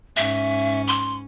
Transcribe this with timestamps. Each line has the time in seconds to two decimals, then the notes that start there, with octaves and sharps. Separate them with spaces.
0.17 G#2 C#4 E5
0.88 C6